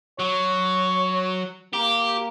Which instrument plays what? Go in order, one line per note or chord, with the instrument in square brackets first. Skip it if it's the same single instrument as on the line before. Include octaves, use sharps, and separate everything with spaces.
[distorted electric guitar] F#3 [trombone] C#5
[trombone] A#3 [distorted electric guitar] G4